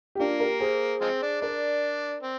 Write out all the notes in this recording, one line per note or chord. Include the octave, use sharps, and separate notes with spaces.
G4
A#3 D4 F4
G4 A#4
G#4 C5
F3 G#3 C4
D4
D4 A#4 D5
C4